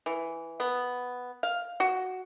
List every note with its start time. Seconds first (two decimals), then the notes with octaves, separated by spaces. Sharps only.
0.06 E3
0.60 B3
1.43 F5
1.80 F#4